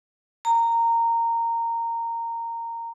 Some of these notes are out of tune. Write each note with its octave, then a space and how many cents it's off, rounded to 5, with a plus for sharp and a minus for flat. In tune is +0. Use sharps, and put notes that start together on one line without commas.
A#5 -15